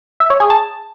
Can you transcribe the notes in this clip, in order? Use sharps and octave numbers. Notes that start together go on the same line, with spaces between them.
E5
C#5
G#4
A5